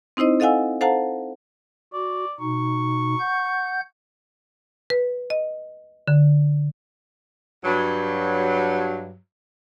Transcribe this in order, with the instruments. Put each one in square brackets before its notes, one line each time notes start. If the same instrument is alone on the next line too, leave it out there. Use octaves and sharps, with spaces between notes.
[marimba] C4 D#4 E4 C5 D#5
A4 D#5 F5 F#5 G#5 E6
A4 C5 F5 F#5 A5 A#5
[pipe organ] F#4 [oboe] D5
[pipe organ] B2 D#4 [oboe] C#6
[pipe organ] F#5 G6
[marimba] B4
D#5
D3
[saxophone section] G2 F#3